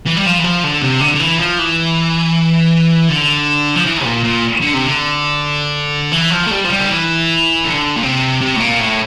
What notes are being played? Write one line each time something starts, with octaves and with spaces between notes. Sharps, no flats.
E3
G3
F3
E3
F3
D3
C3
D3
D3
E3
F3
E3
D3
F3
E3
A#2
A#2
D3
C3
D3
E3
F3
A3
G3
F3
G3
D3
E3
D3
A#2
C3
C3
A2
A#2
A2